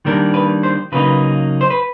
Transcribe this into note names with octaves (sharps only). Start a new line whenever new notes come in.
D#3 G3 A#3 D4 A#4
B4
C5
C#3 F#3 A#3 D#4 B4
C5
B4